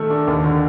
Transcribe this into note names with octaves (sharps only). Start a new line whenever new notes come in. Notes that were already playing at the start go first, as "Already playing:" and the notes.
Already playing: D#3 A3 A4
D4
D#2
D3